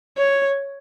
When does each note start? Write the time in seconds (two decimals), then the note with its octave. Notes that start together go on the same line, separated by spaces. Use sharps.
0.18 C#5